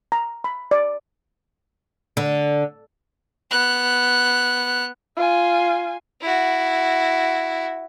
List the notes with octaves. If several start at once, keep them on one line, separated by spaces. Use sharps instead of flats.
A#5
B5
D5
D3
B3 F#6
F4 G#5
E4 F#4